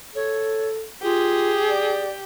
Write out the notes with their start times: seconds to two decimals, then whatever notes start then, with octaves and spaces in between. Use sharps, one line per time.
0.15 A4 C#5
1.02 F4 G4 G#4
1.67 D5